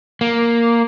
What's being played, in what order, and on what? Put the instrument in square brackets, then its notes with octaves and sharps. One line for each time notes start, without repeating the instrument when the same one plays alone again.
[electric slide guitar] A#3